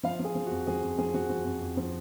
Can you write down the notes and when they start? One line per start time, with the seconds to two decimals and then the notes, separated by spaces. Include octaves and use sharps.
0.03 F3 F5
0.20 F3 G#4
0.35 F3
0.46 F#4
0.51 F2
0.67 F3 G#4
0.83 F2
0.98 F3 G#4
1.14 F3 F#4
1.30 F3
1.45 F2
1.61 F2
1.77 F3